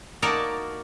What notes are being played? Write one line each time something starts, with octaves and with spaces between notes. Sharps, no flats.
A#3 D#4 F#4 A#4 D5 A5